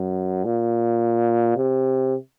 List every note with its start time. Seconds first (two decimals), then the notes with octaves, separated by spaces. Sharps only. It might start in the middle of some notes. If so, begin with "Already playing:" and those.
Already playing: F#2
0.45 A#2
1.56 C3